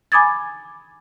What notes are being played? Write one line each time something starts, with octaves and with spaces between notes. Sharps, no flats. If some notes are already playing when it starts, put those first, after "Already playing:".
G#5 B5 D6 D#6 G#6 A6